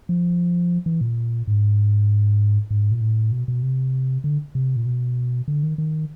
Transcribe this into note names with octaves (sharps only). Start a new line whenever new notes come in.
F3
E3
A#2
G#2
G#2
A#2
A2
B2
B2
C3
D3
C3
A#2
B2
D3
D#3
D#3